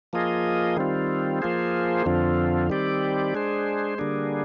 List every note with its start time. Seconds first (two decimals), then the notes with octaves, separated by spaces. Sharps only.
0.13 F3 A#3 F4 G#4 D#5
0.77 D#3 G3 C4 F4
1.42 F3 A#3 F4 G#4 C5
2.06 F2 D3 F3 C4 F4
2.70 D#3 G3 C4 G4 D5
3.35 G#3 D4 G#4 C5
3.98 D3 G3 A#3 D4 G#4